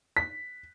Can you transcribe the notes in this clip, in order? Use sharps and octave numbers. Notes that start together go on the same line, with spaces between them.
B6